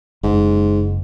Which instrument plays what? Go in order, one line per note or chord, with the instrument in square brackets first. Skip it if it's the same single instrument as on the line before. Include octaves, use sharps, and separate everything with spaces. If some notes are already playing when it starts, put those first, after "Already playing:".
[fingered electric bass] F#1 [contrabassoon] G#2